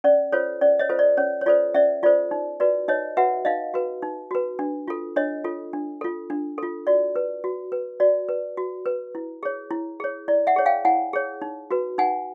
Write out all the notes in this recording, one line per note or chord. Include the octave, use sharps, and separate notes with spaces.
C#4 D5
F4 A4 C5 C#5
C#4 D5
C#5 D#5
F4 A4 C5
D5
C#4 C#5
C#5
F4 A4 C5 D5
C#4 D5 E5
F4 A4 C5 D5
D#4
F#4 B4 D5
D#4 C#5 D#5
F#4 B4 E5 F#5
D#4 D#5 F5
F#4 B4
D#4
F#4 B4
D4
F4 A4
D4 C#5 D#5
F4 A4
D4
F4 A4
D4
F4 A4
F#4 D5
B4
F#4
B4
F#4 D5
B4
F#4
B4
E4
G#4 C#5
E4
G#4 C#5
E4 D5
E5 F#5
G#4 C#5
F5 G5
E4 F#5 G#5
G#4 C#5
D#4
F#4 B4
D#4 F#5 G#5